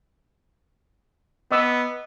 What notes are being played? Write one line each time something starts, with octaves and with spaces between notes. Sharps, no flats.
B3 D#5 D6 E6